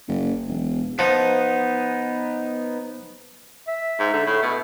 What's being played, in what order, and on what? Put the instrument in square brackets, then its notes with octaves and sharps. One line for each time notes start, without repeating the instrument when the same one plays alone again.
[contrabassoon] F#1
E1
[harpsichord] F3 [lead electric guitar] B3 D#4
[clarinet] E5
[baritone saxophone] G#2
D3
A2
B2